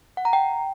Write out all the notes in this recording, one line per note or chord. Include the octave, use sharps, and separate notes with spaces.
F#5
A#5
G5